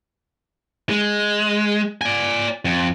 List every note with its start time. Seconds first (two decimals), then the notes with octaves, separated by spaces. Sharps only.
0.90 G#3
2.01 D5 G#5
2.65 F2